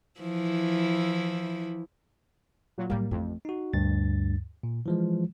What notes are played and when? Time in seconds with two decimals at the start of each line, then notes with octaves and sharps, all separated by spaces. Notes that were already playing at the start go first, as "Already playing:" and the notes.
0.20 E3 F3 E4
2.78 A#2 F#3
2.90 A2 F#3 G3 A#3
3.11 A1 F2 A3
3.45 D#4 F#4
3.74 D2 G2 A6
4.63 A#2
4.86 E3 F3 G#3